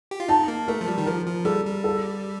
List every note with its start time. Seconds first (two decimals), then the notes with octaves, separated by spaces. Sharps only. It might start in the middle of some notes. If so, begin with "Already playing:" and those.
0.11 G4
0.20 F4
0.28 D#4 A5
0.48 A#3
0.68 A3 A#4
0.81 F3
0.88 G3
0.98 D#3
1.06 F3 A#4
1.26 F3
1.45 G3 A4
1.65 G3
1.84 A4